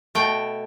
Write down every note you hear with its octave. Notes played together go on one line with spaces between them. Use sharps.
B2 A3 G5